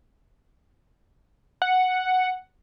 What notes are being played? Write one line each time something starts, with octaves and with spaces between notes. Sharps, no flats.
F#5